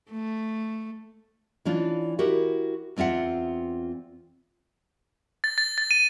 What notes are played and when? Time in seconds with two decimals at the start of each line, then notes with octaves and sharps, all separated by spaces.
0.11 A3
1.65 E3 C#4 D4 F4
2.19 E4 F#4 G4 A#4
2.96 E2 C4 F4 E5 F#5
5.44 A6
5.58 A6
5.78 A6
5.91 D#7